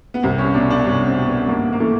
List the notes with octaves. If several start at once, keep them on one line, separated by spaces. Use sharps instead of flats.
B3
C2 C4
C#4
B2 D4
D4
C2 C#4
C4
B2
B3
G#1 A#3
A#3
E3 A3